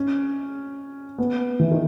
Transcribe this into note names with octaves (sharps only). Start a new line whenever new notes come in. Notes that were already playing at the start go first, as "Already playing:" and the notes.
Already playing: C#4
B3
E3
D#3